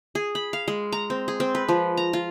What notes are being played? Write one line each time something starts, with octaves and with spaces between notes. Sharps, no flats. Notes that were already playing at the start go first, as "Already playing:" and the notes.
G#4
B5
F5
G#3
A#5
C4
G#4
C4
B4
F3
A#5
F4